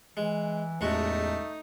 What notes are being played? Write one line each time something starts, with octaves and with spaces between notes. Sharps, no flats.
E3 G#3
A1 E2 G#3 A3 D#4 F#4